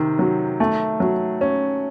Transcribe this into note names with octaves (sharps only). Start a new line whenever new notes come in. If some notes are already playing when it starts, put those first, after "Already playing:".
Already playing: C3 D#3
F#3
A3
F#3
C#4